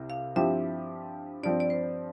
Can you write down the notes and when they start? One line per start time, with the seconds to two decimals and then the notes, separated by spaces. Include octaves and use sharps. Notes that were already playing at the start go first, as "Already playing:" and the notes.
Already playing: C2 C3
0.10 F5
0.36 G2 F3 C4 E4 G4 E5
1.43 G2 F3 C4 D5
1.60 D5
1.70 C5